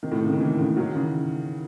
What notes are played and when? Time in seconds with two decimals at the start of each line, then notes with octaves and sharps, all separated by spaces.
0.03 C3 D#3
0.11 A2
0.18 C3
0.25 C#3
0.33 D#3
0.40 C#3 E3
0.59 A2 C#3
0.77 D#3 F#3
0.95 C#3 E3